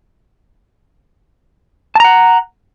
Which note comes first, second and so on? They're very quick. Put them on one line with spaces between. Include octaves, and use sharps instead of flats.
A5 A#5 F#5